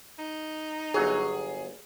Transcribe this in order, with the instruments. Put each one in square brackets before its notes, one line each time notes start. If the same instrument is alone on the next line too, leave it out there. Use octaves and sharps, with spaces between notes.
[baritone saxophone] D#4
[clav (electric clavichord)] G1 F#3 C#5 [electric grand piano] G#4